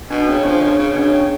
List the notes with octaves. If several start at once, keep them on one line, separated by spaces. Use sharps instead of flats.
B2 D4
C#3 C#4
F3 D4
C#3 D4
C#3
B2 D4
C#3
C#4